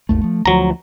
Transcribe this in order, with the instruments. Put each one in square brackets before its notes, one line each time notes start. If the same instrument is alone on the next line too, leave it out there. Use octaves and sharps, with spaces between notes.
[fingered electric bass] G#1 D#2 A3
F3 A3
[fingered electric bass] D2 F3 [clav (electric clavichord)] F#3 A#5